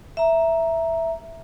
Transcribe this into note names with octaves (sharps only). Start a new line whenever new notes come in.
E5 A#5